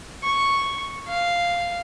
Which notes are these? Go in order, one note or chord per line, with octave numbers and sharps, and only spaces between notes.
C#6
F5